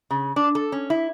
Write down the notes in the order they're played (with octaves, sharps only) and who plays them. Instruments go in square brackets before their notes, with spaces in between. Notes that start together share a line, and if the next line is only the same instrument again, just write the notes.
[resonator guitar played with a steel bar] C#3
D4
A4
C#4
E4